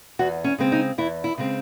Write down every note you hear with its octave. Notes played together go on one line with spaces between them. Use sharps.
E2 F#4
C#4
C#3 G#3 C4
D#4
E2 E4
E4
C#3 G#3 C4